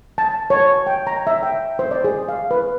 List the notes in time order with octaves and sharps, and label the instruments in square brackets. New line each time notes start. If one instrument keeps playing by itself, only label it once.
[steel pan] A5
C#5
G5
A#5
E5
G5
C5
D5
G#4
F5
B4